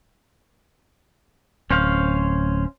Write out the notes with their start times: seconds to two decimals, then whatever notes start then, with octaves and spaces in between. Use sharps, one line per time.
1.71 D1 C#4 C5 F5